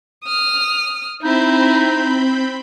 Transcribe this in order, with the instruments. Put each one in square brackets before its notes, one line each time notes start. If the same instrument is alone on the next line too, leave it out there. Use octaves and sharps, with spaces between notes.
[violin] D#6 F6
[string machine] C4 B5 G6 [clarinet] D#4 [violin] E4